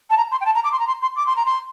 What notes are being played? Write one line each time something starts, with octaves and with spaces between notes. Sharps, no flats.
A5
A#5
C6
G5
A5
A#5
D6
C6
A#5
C6
C6
D6
C6
A#5
C6